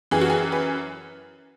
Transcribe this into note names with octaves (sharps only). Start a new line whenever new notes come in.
F#2 E3 G#4
F#4
G#4
B4